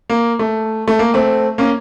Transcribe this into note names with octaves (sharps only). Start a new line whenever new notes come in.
A#3
A3
A3
A#3
A3 C4
A#3 C#4